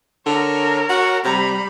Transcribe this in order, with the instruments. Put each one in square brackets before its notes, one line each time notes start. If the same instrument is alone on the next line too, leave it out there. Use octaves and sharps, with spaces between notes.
[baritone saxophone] D3 [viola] A#4 C#5
[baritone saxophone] F#4 [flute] F#5
[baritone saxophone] C3 [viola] G3 B5 [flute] A#5